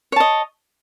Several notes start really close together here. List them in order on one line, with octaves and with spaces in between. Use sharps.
C#5 A5 D#5